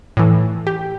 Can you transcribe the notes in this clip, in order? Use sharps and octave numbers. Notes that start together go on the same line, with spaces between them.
A2 E3
G4